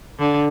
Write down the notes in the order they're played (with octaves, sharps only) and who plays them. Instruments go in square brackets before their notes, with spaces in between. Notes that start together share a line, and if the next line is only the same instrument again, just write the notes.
[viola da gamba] D3